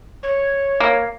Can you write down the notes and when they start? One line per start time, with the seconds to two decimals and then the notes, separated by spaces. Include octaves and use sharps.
0.23 C#5
0.80 A#3